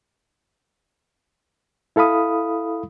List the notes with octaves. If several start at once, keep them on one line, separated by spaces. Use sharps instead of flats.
E4 A4 F5 B5 D#6